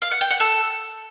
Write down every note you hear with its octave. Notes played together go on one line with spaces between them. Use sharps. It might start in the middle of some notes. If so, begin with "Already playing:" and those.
F5
F#5
G5
F#5
A4